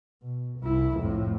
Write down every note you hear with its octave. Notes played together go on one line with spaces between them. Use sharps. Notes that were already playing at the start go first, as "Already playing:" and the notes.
B2
C2 E4
F2 A2